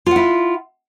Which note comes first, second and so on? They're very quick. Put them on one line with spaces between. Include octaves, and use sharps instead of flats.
F4 F#5 E4